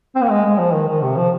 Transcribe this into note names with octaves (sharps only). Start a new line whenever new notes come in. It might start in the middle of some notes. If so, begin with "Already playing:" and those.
C4
A#3
G#3
G#3
F3
D#3
D#3
C3
F3